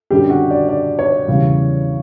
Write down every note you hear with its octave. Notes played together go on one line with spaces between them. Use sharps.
F#2 D3 G3 G4
F#4
D5
D5
C#5
E2 C#3 G3